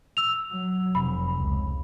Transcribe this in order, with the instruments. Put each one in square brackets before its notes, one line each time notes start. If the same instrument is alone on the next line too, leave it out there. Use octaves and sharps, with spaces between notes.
[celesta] E6 F7
[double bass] F#3
[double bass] F1 [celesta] B5
[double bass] C#2